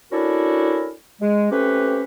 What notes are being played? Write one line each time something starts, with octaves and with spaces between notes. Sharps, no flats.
C#4 D4 E4 F#4 A4 A#4
G#3
A3 C4 C#4 G4 B4